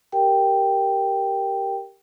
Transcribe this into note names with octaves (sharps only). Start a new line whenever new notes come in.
G4 A#4 G5